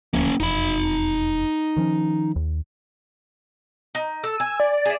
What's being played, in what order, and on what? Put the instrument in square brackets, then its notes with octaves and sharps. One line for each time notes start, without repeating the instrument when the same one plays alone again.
[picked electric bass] D#1 D2 F3 [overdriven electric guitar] A#3 C#4
[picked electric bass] E1 F2 [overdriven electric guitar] D#4 B5
[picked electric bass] D#3 F3 C#4
D#2
[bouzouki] D#4
[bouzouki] A4 [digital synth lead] E6
[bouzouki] G#5
[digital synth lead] D5
[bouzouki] G#4 E5